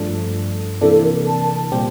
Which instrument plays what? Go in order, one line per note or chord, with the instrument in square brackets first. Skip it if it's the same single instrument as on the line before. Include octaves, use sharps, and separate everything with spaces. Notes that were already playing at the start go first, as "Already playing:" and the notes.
Already playing: [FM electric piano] G2 F3 A3 D4 A4
[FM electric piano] C3 E3 A#3 D4 [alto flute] A4
[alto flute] A#4
A5
[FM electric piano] A#2 G3 C4 G4